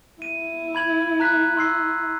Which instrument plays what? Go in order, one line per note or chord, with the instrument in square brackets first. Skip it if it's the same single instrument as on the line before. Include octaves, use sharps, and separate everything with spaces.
[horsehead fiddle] E4 [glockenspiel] D#7
[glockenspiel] B5 G#6 F#7
A#5 F#6 B6
C6 E6 C7